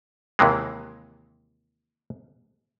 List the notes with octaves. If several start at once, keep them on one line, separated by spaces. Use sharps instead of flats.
D#2 C3 E3 G#3